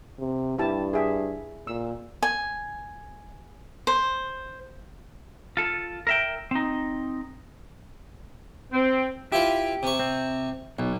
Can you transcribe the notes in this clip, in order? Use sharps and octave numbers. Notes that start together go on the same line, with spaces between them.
C3
G2 E4 G4 A5
G#4 E5
A#2 E6
G#5
C5
F4 A4
A#4 E5 G5
C4 D#4
C4
E4 F4 G4 B4
C3 C#6
C4
B1 B2